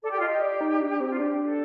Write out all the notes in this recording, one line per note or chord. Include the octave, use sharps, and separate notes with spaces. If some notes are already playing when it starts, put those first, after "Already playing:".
A4 D5
G4
F4
D#5
G4
D5
D#4
D4
D4
C4
F4
D4 G4
A4